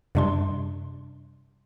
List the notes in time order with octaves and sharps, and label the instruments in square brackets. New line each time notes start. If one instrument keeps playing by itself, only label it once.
[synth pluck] F#2 C3 G3 D4 C6